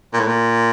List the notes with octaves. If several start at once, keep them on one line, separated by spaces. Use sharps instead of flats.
A#2
A2
A#2